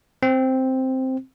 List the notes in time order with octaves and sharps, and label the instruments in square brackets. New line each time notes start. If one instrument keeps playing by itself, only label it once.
[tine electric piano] C4